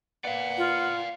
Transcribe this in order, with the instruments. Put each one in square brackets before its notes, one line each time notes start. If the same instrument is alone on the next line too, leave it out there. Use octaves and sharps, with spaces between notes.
[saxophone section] A#3 B4 F#5 [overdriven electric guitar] D5 F5
[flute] F4